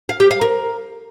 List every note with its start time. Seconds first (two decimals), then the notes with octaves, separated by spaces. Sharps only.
0.09 F5
0.20 G4
0.31 F5
0.41 A#4